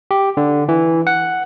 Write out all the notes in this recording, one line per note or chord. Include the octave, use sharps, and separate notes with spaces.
G4
D3
E3
F#5